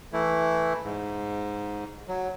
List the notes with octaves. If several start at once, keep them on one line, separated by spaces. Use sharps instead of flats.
E3 A3 E4
G#2
F#3